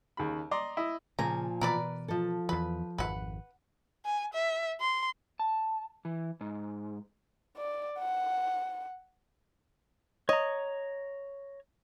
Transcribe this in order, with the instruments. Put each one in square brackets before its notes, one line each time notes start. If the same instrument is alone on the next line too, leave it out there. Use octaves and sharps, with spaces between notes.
[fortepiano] D#2 C#3 B5
D5 D#5 A#5 C6 D6
E4 D#5
[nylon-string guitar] A#2 F3 G#5 [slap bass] C#3 [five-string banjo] A#5
[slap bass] B2 E3 [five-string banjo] A#4 B4 D5
[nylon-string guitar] F3 A4
[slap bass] E2 E3 [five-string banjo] B4
[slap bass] G#1 F2 [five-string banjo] B4 F#5
[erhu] G#5
E5
C6
[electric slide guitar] A5
E3
G#2
[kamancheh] D5
F#5
[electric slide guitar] C#5 A#5 [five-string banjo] D#5